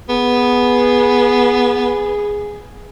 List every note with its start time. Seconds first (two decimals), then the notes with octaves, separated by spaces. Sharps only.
0.09 B3 G#4